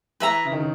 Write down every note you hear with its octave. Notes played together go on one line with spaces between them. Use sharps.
E3 B4 E5 A#5
C#3
D#3
C#3